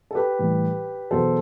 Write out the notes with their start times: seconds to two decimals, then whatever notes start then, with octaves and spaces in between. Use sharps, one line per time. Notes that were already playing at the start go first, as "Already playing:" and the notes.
0.11 A4
0.15 G4 B4
0.39 A2 E3 G3
1.11 E2 B2 F#3 A4 C5